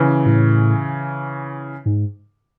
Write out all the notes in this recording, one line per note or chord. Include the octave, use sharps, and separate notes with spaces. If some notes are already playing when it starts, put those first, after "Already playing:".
Already playing: C#3 E3
A2
G#2